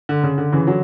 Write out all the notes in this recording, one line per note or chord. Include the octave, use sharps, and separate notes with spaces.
D3
C#3
D3
C#3 E3
D3 F#3